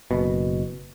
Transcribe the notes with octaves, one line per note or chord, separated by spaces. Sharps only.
F#1 B2